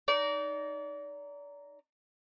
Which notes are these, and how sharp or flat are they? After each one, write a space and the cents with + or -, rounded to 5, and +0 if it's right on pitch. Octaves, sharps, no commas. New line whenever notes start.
D#4 -10 D5 -35